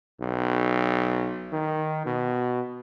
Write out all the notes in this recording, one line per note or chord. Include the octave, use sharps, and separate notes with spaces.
B1
D#3
B2